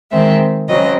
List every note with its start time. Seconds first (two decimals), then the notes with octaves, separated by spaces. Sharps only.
0.12 D#3 G#3 C4 E5
0.68 C#3 F#3 C4 D#5